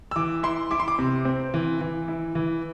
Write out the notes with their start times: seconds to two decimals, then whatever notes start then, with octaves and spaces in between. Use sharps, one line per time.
0.11 E6
0.16 E3 D6
0.43 E4 C6
0.71 E4 D6
0.80 C6
0.88 D6
0.99 C3
1.25 C4
1.54 E3
1.81 E3
2.08 E4
2.35 E3